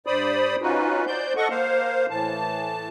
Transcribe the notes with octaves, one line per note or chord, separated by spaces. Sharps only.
G2 C5 D5 B5 D#6
C#4 D#4 F4 F#4 B4
C5 D5 G6
A4 D#5 F#5 C#6
A#3 C5 F5
A2 E3 A5